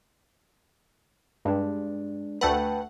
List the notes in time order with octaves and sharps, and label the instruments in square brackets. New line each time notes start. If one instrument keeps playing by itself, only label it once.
[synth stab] G2 [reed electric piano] G#3 D4
[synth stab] D2 A3 F#5 [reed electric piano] B4 G5 A5